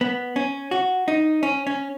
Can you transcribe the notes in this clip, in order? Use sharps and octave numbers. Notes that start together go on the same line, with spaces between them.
B3
C#4
F#4
D#4
C#4
C#4